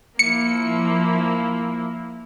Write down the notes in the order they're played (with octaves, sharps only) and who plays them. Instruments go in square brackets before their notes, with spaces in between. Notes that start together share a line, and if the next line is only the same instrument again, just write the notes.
[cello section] F3 E4 [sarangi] A#3 [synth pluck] C#7